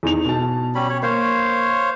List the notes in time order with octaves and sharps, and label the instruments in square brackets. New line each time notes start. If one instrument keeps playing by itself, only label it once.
[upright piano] E2 D#4 F7
B2 A5
[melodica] G3 C#4 B5
C#5
[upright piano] A#3 [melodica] C5 C#5 F5